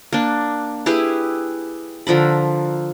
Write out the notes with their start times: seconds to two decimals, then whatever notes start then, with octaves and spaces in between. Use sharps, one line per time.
0.13 A#3 D4
0.86 E4 G4 G#4 B4
2.07 D3 F3 A#4 B5